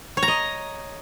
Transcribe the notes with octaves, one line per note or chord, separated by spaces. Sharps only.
C#5
A#5
D#5